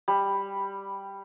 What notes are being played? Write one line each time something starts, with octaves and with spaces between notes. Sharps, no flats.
G3